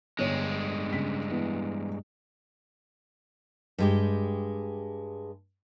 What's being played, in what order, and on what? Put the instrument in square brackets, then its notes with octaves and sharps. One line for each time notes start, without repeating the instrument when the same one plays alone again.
[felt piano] G1 C#5 [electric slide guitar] G2 G#3
[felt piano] C#3 B6
E3 B3
[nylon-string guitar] G2 G#3 G4